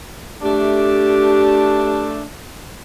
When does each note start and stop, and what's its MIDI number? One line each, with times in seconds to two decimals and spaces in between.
0.43 2.23 57
0.43 2.23 62
0.43 2.09 67